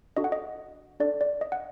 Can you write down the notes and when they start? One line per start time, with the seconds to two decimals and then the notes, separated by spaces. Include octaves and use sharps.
0.17 D4 F#4 A4 D#5
0.24 F#5
0.32 D#5
1.00 D4 A4 D5
1.21 D5
1.41 D#5
1.52 F#5